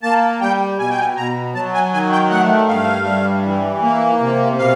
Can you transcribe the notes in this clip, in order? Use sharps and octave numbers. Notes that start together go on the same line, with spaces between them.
A#3 A5
G3 G5
B2 G#5
G5
G#5
B2 A#5
F#3 A5
G#5
D#3 G#5
G5
A3 F#5
G2 F5
G3
E3
A#3
C3
B2 F5